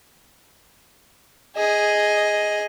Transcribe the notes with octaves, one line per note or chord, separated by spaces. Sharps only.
G#4 D#5